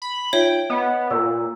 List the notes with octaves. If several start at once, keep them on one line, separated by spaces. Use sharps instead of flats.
B5
D#4 F4 C#5 E5 G5
B3 D#5
A#2 E6